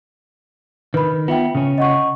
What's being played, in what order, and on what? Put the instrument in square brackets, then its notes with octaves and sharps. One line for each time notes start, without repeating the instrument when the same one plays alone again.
[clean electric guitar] D#3 [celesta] B4 B5
[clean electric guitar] B3 [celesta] F4 E5 G5
[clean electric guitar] C#3 C#4
[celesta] D#5 F#5 C#6